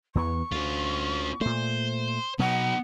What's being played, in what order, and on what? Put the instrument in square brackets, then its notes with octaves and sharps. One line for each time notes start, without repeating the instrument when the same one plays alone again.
[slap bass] E2 E3 B3 [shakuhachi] C#6
[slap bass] D2 [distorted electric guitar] C#4 F4
[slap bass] A#2 A3 [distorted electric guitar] C5
[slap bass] B2 F#3 [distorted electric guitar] B3 D#4 [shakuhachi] F#5